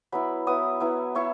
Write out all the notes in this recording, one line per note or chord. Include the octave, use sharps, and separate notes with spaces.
F#3 B3 E4 B5
F#3 B3 E4 D#6
F#3 B3 E4
F#3 B3 E4 C#6